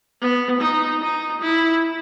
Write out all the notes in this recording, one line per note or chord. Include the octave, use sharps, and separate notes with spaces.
B3
D#4
D#4
E4